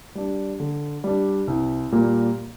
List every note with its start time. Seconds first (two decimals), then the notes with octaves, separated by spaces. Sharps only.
0.15 G3 D4
0.60 D3
1.04 G3 D4
1.48 C2
1.92 A#2 G3 A#3